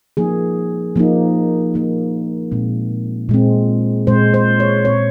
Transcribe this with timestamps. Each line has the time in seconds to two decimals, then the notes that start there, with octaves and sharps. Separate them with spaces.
0.17 F3 A#3 D#4 G#4
0.96 F3 A#3 D#4
1.74 F3 A#3 D#4
2.52 A#2 G#3 C4
3.29 A#2 G#3 C4
4.07 A#2 G#3 C4 C5
4.34 C5
4.60 C#5
4.85 A#2 G#3 C4 C#5